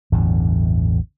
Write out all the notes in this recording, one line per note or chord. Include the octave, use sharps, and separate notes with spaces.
A1 E2 G2 D3